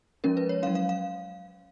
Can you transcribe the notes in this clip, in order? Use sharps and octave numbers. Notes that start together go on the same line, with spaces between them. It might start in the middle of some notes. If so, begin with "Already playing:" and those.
F3 G#3 C#4 A#4
B4
C#5
F#3 C#4 F5
F5
F5